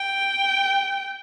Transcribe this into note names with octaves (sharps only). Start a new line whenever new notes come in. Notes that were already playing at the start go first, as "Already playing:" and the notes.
Already playing: G5